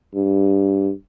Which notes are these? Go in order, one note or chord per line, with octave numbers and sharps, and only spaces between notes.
G2